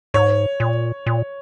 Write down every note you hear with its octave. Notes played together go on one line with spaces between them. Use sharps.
G#2 C#5
A#2
A#2